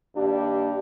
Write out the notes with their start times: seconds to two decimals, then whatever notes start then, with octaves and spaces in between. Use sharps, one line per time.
0.15 G2 D#3 A#3 D4 G4